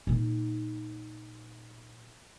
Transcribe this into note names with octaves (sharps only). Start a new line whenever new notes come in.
A#2 D#4